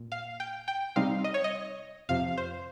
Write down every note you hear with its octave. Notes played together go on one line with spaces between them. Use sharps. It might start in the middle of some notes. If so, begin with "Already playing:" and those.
Already playing: A#2
F5
G5
G5
C3 G3 C4 D#4 F5
D#5
C#5
D#5
F2 C3 F3 F5
C5